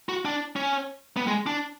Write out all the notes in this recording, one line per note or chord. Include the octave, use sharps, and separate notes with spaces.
F#4
D4
C#4
B3
G#3
D4